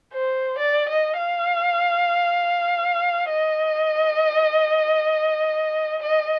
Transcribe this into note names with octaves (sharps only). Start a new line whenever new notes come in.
C5
D5
D#5
F5
D#5
D#5